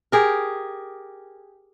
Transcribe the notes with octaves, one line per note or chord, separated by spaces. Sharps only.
G4 G#4 A#4